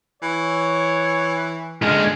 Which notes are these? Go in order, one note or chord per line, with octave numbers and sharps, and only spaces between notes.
E3 C#5
D3 G#3 F6